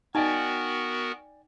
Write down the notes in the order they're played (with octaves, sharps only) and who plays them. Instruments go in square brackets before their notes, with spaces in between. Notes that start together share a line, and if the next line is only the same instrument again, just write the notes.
[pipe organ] B3 F#4 A#4 [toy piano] D#4 D#5 [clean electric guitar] D5 G5 G#5